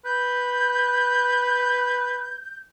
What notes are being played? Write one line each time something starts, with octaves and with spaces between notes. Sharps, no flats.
B4 G6